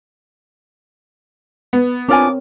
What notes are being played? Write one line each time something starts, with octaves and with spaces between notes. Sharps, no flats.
B3
C4 D4 F4 A#4 C#5 G#5 D6